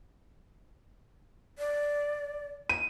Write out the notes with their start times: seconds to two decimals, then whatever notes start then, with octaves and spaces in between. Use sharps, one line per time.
1.59 D5
2.69 D#7